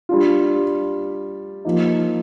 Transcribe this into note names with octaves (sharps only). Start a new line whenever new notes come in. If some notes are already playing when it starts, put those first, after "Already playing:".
G3 D4 F4
F3 A#3 D#4